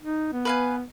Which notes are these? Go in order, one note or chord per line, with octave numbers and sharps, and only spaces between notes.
D#4
B3
B4 F5 G#5